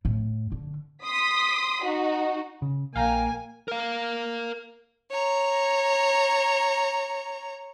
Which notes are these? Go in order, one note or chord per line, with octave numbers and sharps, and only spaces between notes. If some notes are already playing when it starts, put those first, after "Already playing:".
A2
D3
C6 D#6 B6
D#4 F#4
C#3
A#1 A#3 F5 G5 G#5 A#5
A#4 F5
C#5 A#5